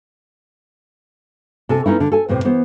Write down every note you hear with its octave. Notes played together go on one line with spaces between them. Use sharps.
C3 A4 G#5
B3 C#4 D#4 E4
D3
A4 G#5
E2 A2 C3 C5
E3 B3 C5